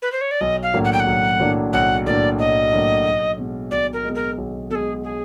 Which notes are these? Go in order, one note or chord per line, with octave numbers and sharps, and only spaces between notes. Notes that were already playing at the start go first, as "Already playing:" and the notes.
B4
C5
C#5
D5
B1 D#5
F5
A2 F#3 A#3 D4
F#5
G5
F#5
B1
A2 F#3 A#3 D4
B1 F#5
A2 F#3 A#3 D4 D5
B1 D#5
A2 F#3 A#3 D4
B1
B2 G#3
B1 D5
A#4
B2 G#3
A#4
B1
B2 G#3 G#4 A4
G#4